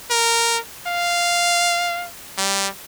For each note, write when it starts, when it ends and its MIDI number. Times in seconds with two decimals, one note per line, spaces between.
0.11 0.58 70
0.87 2.07 77
2.38 2.67 55